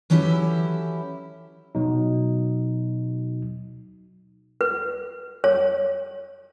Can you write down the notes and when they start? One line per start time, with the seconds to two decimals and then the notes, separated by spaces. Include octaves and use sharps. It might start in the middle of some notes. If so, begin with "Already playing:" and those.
0.10 E3 F#3 C#4 E4 G4 A4
1.75 B2 F#3 D#4
4.61 B4
5.44 C#5